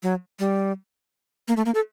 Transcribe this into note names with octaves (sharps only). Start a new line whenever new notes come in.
F#3
G3
A#3
A3
A#3
A4